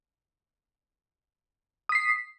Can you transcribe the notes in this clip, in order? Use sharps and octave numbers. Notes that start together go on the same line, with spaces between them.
D#6 B6 C7